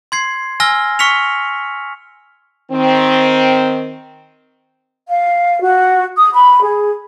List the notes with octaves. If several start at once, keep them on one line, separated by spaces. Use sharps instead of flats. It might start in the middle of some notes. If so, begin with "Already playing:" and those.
C6 G#6 C7
G#5 E6 F6 A#6 G7
C#6 F6 B6 C#7 F7
D#3 C4
F5
F#4
D#6
B5
G#4